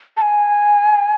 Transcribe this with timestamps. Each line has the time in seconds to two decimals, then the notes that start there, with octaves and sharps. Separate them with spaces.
0.17 A5
0.22 G#5